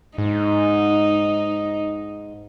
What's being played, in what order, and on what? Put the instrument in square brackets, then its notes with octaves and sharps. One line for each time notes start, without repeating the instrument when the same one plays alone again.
[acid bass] G#2 [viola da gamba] D#4